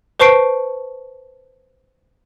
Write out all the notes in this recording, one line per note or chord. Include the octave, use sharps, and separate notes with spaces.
B4 C5 A5 C#6 C7 D7